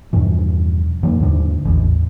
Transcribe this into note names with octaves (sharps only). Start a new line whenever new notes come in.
E2 G2 B2 F3
F2 D#3 F#3 A#3
D#2 G#2 D3
A1 E2